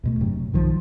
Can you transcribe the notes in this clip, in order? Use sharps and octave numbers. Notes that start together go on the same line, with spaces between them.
E2 B2 A3
F#1 G2 C3 F#3
B1 D#3 F3